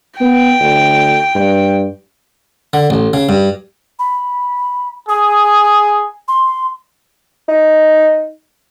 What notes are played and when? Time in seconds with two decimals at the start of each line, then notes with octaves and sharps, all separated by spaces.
0.21 B3 G5
0.60 D2
1.35 G2
2.73 D3
2.90 A1
3.13 C#3
3.29 G2
3.99 B5
5.09 G#4 D#6
6.28 C6
7.49 D#4